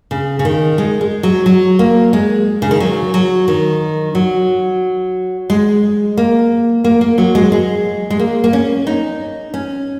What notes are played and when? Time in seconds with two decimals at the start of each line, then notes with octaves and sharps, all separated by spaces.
0.11 C#3
0.39 C#3
0.45 D#3
0.78 G#3
1.01 G#3
1.23 F#3
1.46 F#3
1.79 A#3
2.13 G#3
2.62 C#3
2.71 D#3
2.80 F#3
3.14 F#3
3.48 D#3
4.15 F#3
5.50 G#3
6.17 A#3
6.84 A#3
7.01 A#3
7.18 F#3
7.35 G#3
7.52 G#3
8.10 G#3
8.19 A#3
8.44 A#3
8.53 C#4
8.87 D#4
9.54 C#4